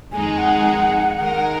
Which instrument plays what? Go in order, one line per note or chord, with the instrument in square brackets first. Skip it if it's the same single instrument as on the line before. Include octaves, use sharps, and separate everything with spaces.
[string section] F2 D#3 G#3 D#4 G#4 [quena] G#5
[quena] F#5
[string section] D#3 G#3 D#4 A#4